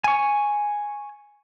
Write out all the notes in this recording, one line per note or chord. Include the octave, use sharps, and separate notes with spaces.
G#5 C#6